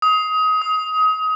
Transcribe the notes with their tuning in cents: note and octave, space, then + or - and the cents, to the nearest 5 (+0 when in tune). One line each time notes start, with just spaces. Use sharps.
D#6 +25
D#6 +30